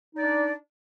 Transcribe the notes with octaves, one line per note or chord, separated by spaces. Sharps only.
D4 D#4 D5